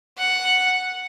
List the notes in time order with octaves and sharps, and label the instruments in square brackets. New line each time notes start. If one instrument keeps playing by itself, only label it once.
[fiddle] F#5